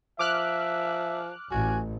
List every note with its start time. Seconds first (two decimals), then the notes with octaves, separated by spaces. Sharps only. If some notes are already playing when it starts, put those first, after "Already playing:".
0.19 F3 E5 D6 F6 F#6
1.51 A1 F#4 G#5